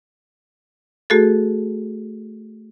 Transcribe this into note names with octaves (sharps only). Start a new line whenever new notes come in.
A3 F#4 G#4 A4